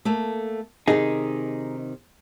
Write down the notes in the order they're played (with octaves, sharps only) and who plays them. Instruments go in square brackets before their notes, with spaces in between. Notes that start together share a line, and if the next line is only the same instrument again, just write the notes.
[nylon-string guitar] A3 A#3 A4
[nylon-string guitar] C3 D#3 [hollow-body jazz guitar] D#4 G#4